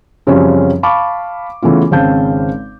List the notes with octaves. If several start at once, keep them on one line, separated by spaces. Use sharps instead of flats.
F#2 C#3 F3 G3 C4 C#4
F5 A5 B5 C#6 D6
C#3 E3 A3 B3 F4
G#1 C#3 C4 F5 A5 G6